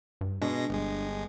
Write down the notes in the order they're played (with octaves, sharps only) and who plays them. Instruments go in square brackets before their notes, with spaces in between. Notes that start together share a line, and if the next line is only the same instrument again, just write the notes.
[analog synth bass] G2
[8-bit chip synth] B2 G#3 A#6 [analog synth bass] D4
[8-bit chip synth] G1 G#3